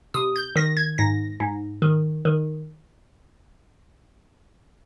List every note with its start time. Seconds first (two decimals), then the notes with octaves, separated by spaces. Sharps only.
0.14 C3 D#6
0.36 G6
0.56 D#3 A#6
0.77 G#6
0.98 G#2 A#6
1.40 G#2
1.82 D#3
2.25 D#3